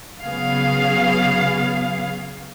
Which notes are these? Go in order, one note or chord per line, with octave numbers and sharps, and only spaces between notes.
C#3 F#3 B3 G#4 F5